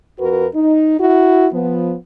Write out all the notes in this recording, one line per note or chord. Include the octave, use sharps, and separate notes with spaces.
F2 F#4 A#4 B4
D#4
E4 F#4
F3 B3